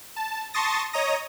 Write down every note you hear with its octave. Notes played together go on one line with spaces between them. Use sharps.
A5
A5 C6 C#6 D#6 A6 A#6
C#5 D#5 A#5 D#6 A#6